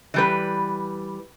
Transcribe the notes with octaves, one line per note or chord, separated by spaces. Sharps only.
E3 G3 B4